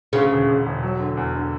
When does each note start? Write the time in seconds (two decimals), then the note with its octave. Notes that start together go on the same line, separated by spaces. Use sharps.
0.13 D2 C#3
0.31 E1
0.48 E1
0.66 E1
0.83 F#3
1.00 D3
1.17 E2
1.35 D3